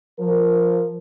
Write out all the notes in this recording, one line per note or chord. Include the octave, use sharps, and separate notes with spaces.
F3 A#4